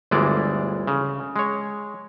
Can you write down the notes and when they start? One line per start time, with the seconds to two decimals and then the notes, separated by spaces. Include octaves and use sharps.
0.11 G1 D2 E3 G#3 D5
0.87 C#3
1.36 G#3 C#5